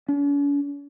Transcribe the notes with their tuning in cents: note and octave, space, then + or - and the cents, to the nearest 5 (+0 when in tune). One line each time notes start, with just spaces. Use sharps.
C#4 +45